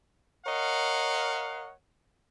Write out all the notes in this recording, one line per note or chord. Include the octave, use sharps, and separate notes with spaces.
A#4 C#5 D#5 F5 F#5